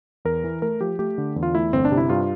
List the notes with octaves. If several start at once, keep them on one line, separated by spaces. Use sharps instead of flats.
E2 A#4
E3
A3 A#4
F3 G4
A3 G4
D3
E2
F4
A3 E4
G1 C4
D4
C3
E4
G2 F4